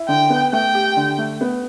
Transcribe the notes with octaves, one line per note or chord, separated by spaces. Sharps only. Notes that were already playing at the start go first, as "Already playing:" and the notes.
Already playing: E4
D3 G5
B3
A3 G5
G4
D3
A3
B3